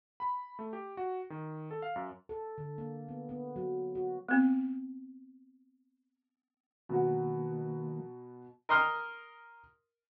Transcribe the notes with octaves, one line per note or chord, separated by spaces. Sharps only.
B5
A3
G4
F#4
D#3
A4
F5
F#2
A4
D3
A#3
B3
B3
F#3
F#4
B3 C4
B2 D#3 F3 F#3 A#3 F#4
A#4 D#5 C6 D#6 F6